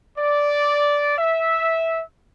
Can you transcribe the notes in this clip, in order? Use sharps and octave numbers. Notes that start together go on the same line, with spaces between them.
D5
E5